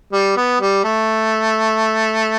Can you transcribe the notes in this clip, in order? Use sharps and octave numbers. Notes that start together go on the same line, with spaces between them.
G3
B3
G3
A3